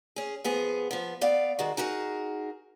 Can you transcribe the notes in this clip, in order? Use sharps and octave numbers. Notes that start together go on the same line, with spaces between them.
C#4 G#4
F3 B3 G#4
F3 B3
B3 D5 F5
D#3 G#3 F#4
D#4 F#4 G#4 A#4